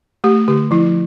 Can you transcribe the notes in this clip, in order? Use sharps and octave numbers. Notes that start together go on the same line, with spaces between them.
A3 G4
D3 G4
F3 E4